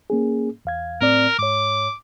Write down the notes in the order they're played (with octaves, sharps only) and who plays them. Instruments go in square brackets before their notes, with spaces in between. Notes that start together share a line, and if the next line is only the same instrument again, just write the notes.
[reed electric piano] A#3 C#4 G#4
E2 F5 G#6
[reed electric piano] A2 C4 D5 [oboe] A#4
[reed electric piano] G#2 C#5 [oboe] D6